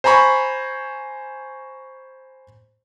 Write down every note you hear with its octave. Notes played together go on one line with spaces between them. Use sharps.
C5 G#5 A#5 B5 C#6